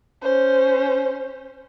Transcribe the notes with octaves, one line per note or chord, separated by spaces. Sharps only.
C#4 C5